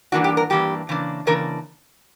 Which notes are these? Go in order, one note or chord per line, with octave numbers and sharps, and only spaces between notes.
G2 E3 A#3 D4 F#4
G4
A#4
G2 E3 A#3 D4 G4
C#3 E3 A#3 D4
C#3 E3 A#3 D4 A#4